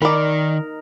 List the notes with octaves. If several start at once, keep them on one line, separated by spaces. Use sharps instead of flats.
D#3 D#4 A#4 D5 B5